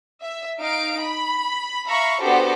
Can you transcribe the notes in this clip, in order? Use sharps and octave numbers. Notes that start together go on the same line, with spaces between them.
E5
D#4 F5 D7
B5
E5 F5 A#5 B5 C#6
B3 D4 F#4 G4 A4 C5